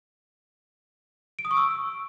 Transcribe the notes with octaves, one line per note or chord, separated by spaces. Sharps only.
D7
D#6
C#6
E6